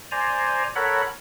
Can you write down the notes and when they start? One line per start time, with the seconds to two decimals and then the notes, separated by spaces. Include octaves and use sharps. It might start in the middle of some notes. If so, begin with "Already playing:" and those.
0.11 C5 D5 G#5 A#5
0.76 A4 A#4 C#5 F#5 B5